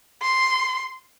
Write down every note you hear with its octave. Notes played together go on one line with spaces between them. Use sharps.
C6